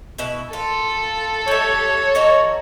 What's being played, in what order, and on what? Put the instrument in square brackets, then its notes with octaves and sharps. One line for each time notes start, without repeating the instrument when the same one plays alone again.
[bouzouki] B2 E4 B4
[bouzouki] F4 [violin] A4
[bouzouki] G3 E5 [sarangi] C#5
[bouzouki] E3 D#4 F#4